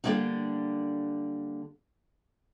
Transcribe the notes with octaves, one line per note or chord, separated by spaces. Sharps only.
D3 G3 A#3 D4 D#4